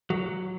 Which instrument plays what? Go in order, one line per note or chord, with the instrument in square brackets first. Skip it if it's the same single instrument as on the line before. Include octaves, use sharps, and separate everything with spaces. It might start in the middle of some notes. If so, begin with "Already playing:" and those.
[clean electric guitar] F#3